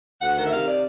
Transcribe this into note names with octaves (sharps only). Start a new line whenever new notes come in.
D2 F#5
D#3 F#5
E5
C3 F5
D5